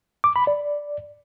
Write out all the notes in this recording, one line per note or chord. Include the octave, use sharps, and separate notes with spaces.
D6
B5
D5